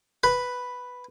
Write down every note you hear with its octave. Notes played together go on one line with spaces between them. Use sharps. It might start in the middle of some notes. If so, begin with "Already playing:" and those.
B4